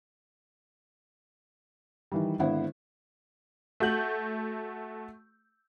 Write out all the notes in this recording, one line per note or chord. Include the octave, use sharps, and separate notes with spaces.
D#3 E3 G3
G#1 D3 B3 E4 C5 F#5
A3 F#4 G6 F#7